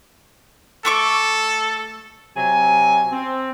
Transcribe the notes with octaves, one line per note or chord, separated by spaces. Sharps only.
A3 A4 C#6 D6
C3 F#3 G#5
C4